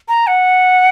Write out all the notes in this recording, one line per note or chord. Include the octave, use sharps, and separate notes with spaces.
A#5
F#5